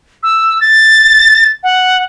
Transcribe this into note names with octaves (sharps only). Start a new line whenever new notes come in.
E6
A6
F#5